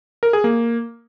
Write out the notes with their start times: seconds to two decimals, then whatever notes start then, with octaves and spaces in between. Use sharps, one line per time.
0.23 A#4
0.33 G#4
0.44 A#3